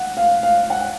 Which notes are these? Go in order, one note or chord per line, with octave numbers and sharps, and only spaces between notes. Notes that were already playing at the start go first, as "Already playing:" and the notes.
Already playing: F#5
F5
F5
F#5